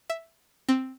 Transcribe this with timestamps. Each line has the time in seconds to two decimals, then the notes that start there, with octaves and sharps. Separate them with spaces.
0.10 E5
0.69 C4